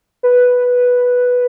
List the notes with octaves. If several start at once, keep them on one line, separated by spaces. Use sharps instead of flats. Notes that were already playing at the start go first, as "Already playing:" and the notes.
B4